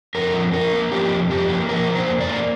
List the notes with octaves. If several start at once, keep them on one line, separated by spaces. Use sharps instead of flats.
F2 A#4
F3
F3 A#4
A#3
F3 G4
F2
F3 G4
A#3
F3 A#4
A#3
C5
F2
D5
A#3